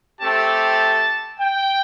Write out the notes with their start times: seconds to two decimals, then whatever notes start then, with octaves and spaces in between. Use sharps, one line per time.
0.20 A3 C4 G4 A5
1.40 G5